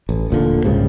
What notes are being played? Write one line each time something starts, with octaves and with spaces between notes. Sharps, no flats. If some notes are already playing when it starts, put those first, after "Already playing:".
A1
D#1 A#2 D3
C2 G#2 C#3 G3